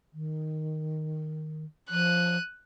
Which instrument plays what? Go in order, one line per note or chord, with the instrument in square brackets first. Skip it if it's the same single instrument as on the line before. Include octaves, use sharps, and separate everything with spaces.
[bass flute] D#3
[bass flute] F3 [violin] F#6 D#7